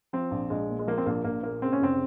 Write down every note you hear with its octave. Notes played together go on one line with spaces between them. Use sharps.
F3 C4
A#1
A#1 G#3
A#2
G#3
F3 A#3
C4
A#1 A#3
A#1 A#3
A#2 A#3
C#3 C4
C#4
F1 C4